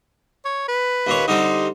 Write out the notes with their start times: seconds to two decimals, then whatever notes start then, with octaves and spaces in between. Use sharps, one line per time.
0.45 C#5
0.68 B4
1.07 D#2 A#2 C#5
1.28 D3 G3 C4 D#4